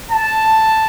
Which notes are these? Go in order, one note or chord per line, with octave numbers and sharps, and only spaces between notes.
A5